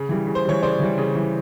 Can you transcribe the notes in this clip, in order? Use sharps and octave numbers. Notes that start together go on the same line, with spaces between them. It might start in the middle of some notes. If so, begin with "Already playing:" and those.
Already playing: C#3
E3 G3
C#3
C5
E3 G3 C#5
C#3 C5 D5
E3 G3
C#3
E3 G3